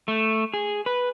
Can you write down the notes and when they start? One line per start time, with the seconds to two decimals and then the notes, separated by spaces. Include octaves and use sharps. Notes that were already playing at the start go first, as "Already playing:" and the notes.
0.08 A3
0.54 G#4
0.86 B4